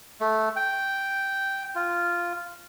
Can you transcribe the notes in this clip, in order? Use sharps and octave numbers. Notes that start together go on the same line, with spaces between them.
A3
G5
F4